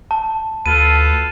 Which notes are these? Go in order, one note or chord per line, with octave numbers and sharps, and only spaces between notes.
A5
D2 F4 A4 B4 D#7